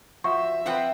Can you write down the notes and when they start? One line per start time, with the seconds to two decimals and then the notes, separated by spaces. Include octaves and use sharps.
0.24 F3 F#4 C5 E5 C#6
0.66 F3 C4 F4 B4 F#5 G5